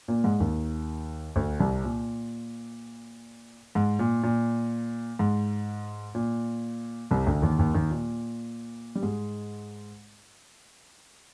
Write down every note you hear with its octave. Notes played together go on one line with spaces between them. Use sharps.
A#2 A#3
G#2 G#3
D#2 D#3
D2 D3
C2 C3
A#2
G#2
A#2
A#2
G#2
A#2
C2 C3
D2 D3
D#2 D#3
D#2 D#3
D#2 D#3
A#2
G3
G#2 G#3